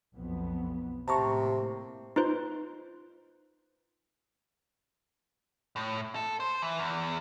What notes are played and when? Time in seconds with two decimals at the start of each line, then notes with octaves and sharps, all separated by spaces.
0.15 B1 F2 B3
1.08 A2 C3 A#3 A5 A#5 C#6
2.16 D#4 F4 B4 C5 C6
5.76 A2
6.15 A4
6.40 C5
6.62 E3
6.79 E2